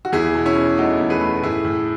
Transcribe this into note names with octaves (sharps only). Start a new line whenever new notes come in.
F#4
E2 E4 G#4
B2
C#4 E4
B2
A3 D#4 F#4
E2
G#4 B4
A3
A2 E4 G#4
A2